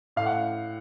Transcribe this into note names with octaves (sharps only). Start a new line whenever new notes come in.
A2 F5
F#5